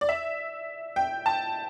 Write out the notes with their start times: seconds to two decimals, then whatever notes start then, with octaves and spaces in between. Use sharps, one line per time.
0.01 D5
0.09 E5
0.96 G5
1.26 A5